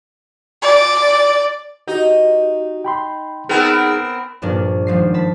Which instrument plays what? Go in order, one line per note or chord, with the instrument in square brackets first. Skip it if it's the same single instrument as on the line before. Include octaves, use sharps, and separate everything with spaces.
[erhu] D5
[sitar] D#4 [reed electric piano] F#4 G4
[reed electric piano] G5 B5 C6
[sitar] B3 C4 A#4 [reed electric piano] D#4 G#4
[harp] A#1 G2 D4 A#4
G#1 F3 C7
A5 B5